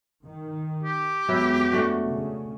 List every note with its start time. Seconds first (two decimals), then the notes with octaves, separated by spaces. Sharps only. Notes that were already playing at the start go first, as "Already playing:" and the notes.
0.23 D#3
0.84 G4
1.28 F2 F#3 G#3 B3 B4 E5
1.72 A3 D4 F#4
2.05 C#3